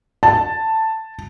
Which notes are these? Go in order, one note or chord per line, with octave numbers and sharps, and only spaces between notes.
A5